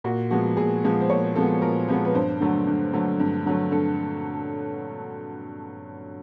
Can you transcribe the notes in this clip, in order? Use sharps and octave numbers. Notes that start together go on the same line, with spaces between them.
A#2 F#4
F3 G#3 B3 F#4
A#2 G#4
F3 G#3 B3
C5
A#2 C#5
F3 G#3 B3 A4
A#2 A#4
F3 G#3 B3 B4
B4
G2 C5
D3 F#3 A3
G2
D3 F#3 A3
G2
D3 F#3 A3
G2 A4